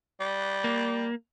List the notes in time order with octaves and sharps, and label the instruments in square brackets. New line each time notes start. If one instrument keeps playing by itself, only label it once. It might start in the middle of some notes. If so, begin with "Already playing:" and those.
[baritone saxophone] G3
[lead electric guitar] A#3